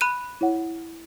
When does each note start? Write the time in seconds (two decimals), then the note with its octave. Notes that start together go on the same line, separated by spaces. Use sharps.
0.01 B5 F#6 D#7
0.41 E4 C#5 F#5